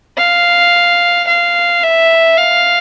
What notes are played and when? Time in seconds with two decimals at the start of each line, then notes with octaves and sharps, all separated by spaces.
0.17 F5
1.27 F5
1.83 E5
2.37 F5